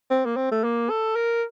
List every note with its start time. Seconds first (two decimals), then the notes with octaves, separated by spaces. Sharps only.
0.11 C4
0.26 A#3
0.37 C4
0.52 A3
0.64 A#3
0.90 A4
1.16 A#4